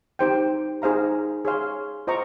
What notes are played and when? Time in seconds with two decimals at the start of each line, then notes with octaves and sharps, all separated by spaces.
0.19 D#4 G4 C5 G5
0.82 D#4 G#4 C5 F5 A#5
1.45 G#4 C#5 F5 C6
2.07 F4 C5 D#5 A#5 C#6